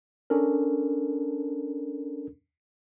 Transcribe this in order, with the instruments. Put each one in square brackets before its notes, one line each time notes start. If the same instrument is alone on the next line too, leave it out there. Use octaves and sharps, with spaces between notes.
[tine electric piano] C#4 D4 A4 A#4